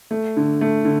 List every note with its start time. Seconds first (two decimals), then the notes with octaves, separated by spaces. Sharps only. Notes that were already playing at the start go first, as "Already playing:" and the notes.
0.11 A3
0.37 D3
0.61 A3
0.85 D3